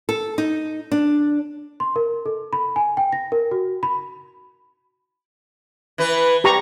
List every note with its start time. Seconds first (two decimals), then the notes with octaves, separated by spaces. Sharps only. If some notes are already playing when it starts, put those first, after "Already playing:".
0.09 A4
0.38 D#4
0.92 D4
1.80 C6
1.96 A#4
2.26 A4
2.53 B5
2.76 G#5
2.97 G5
3.13 A#6
3.32 A#4
3.51 F#4
3.83 B5
5.98 E3 B4
6.44 G4 A#5 C#6